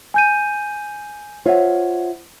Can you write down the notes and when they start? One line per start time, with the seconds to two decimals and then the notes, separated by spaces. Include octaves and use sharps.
0.14 G#5 G6 D#7
1.46 F4 C5 C#5 E5 F#5